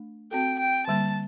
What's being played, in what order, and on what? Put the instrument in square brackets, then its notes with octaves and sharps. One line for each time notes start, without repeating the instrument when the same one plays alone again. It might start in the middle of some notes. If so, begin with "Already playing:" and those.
Already playing: [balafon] A3 D4
[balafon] C4 F#4 A4 [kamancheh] G5
[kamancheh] G5
[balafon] D3 G3 A#3 [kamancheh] A5